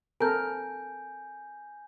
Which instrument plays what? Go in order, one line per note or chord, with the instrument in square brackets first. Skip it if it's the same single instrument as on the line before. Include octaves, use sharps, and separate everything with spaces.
[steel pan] C4 A4 A#4 [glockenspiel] G#5 G6